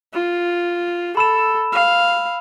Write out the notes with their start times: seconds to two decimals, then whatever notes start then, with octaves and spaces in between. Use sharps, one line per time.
0.14 F4
1.17 A4 B5 E6 E7
1.73 F5